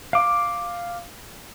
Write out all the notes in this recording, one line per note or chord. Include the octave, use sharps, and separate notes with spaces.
F5 D6